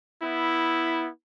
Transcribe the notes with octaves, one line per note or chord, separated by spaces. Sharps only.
B3 E4